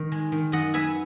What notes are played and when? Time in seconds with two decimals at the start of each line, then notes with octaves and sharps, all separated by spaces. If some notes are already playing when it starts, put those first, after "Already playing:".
Already playing: D#3
0.12 G#3
0.32 D#3
0.52 F#2 D#5 F#5
0.74 B3 E5 G#5